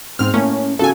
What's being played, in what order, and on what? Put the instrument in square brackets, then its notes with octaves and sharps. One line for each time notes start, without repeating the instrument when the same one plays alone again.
[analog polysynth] G#2 F6 [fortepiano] C4
[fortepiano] A2 A#3 [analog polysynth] C#4
[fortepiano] C#3 F#3 [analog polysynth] A4 G#5